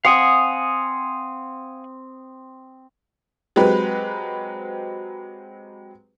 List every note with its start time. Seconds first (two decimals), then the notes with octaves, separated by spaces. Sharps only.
0.05 C4 F5 F#5 G#5 D#6
3.56 F#3 G#3 C4 G4 B4